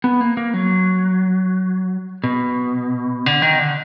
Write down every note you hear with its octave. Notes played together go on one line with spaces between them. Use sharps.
B3
A#3
A#3
F#3
B2
D3
D#3
D3